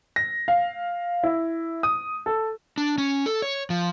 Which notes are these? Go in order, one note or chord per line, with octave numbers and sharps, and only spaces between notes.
A#6
F5
E4
D#6
A4
D4
C#4
A4
C#5
F3